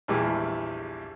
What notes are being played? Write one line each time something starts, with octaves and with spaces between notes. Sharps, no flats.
A#1 E2 E3 G3 G#3